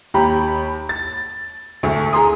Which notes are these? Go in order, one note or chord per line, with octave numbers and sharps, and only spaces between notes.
D#2 G4 A#5 B5
A6
D2 A3
G#4 A#5 C6 D#6